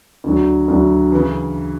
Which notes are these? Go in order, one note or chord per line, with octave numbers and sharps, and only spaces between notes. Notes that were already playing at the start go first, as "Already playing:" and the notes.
D2 D3 F#3
D2 D3 F#3
C#3 E3